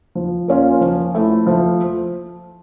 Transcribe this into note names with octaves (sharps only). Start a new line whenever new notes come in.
F3
A#3 C#4 F4
F3
A3 E4
F3